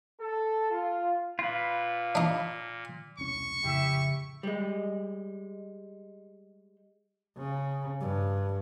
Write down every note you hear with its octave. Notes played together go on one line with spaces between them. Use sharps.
A4
F4
A#2 F4 B4
D4 D#4
E1 C2 C#4 C#6
F2 A2 C#3 E4 G4 E5
G3 G#3
C#3
G2